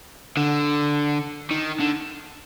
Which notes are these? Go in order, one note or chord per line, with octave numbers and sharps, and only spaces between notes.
D3
D#3
D3